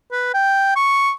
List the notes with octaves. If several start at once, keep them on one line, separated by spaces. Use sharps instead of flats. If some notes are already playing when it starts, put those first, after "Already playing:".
B4
G5
C#6